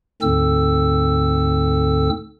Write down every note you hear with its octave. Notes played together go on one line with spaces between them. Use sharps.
D2 G#2 D3 C4 A4 E6